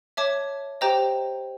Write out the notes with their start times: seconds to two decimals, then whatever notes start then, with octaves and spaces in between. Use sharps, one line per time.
0.17 C#5 E5 A5 D6
0.81 G4 C5 D#5 G5 A#5